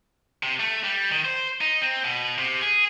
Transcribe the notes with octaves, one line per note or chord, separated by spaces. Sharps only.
C3
A3
G3
D#3
C5
D#4
C4
B2
C3
G#4